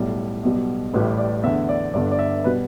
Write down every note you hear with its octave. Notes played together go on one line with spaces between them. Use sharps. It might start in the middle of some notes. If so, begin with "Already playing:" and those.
Already playing: B1 A2 G3
B1 B2 G3
A1 A2 G3 B4
D5
E2 D3 A3 E5
D5
G1 G2 D3 D5
D5
E5
B2 G3 B4